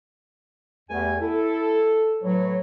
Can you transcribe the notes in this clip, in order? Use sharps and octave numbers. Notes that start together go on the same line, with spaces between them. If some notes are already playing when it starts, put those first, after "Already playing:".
E2 G3 A3 B3 G#5
E4 A4
A2 F#3 B4 C#5